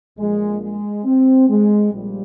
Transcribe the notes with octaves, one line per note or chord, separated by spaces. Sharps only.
A#1 A#2 F3 G#3
G#3
C4
G#3
A#1 A#2 F3 G3